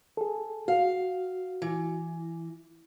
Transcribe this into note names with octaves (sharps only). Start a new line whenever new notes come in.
G#4 A4
F#4 F5
E3